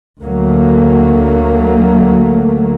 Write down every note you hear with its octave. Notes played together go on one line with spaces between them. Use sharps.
D2 F#3 A3 A#3